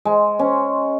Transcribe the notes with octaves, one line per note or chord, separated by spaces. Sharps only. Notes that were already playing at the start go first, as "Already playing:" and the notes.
G#3
C#4